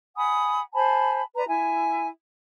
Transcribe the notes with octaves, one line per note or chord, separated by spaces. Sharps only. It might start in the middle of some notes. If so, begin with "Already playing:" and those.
F#5 G#5 B5 D#6
C5 G#5 A5 B5
B4 D5 A#5
E4 E5 G#5